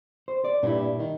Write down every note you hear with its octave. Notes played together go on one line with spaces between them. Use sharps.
C5
D5
G2 A#2 E4
D#3